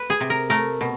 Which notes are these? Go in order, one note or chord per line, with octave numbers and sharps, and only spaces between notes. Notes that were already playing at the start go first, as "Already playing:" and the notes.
Already playing: B4
G#4
C3
A#4
A3 A#4
B2